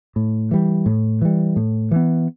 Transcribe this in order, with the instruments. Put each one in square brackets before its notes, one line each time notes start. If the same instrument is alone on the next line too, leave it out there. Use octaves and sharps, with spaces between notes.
[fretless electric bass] A2
E3 G3
A2
E3 G3
A2
E3 B3